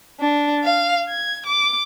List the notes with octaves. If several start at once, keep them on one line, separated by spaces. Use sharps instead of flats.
D4
F5
G#6
D6